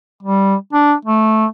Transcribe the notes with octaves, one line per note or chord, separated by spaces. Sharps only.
G3
D4
A3